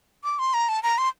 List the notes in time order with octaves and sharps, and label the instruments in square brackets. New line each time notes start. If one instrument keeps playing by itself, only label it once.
[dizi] D6
C6
A#5
A5
A#5
C6